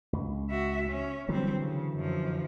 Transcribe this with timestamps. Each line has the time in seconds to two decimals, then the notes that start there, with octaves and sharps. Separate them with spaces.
0.13 C#2
0.50 F#4 E5
0.88 C#4
1.29 D3 E3 F#3 G3 C4
1.62 C#3
1.97 F#2 F3